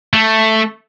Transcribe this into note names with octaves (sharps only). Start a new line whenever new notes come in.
A3